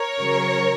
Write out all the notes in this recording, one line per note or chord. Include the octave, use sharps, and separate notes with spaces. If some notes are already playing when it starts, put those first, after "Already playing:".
Already playing: A#4 C#5
C#3 F#3